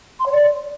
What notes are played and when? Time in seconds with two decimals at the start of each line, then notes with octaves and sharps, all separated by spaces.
0.20 C6
0.26 C#5
0.32 D5